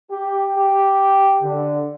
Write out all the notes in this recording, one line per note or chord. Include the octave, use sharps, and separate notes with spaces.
G4
G4
D3